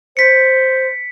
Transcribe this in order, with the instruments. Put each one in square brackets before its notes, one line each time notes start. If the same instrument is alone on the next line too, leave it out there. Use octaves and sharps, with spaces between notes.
[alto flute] C5 [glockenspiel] B6 C#7